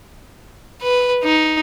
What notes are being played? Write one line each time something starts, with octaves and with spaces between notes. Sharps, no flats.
B4
D#4